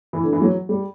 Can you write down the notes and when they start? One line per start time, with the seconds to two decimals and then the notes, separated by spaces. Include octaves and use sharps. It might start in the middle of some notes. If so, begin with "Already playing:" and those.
0.13 E3
0.23 D3
0.33 E3
0.42 F#3
0.69 G3